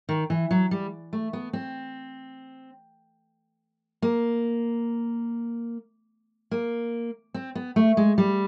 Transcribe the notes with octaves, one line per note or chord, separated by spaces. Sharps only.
D#3
E3
F#3
G3
A3
B3
C4
A#3
A#3
C4
B3
A3
G#3
G3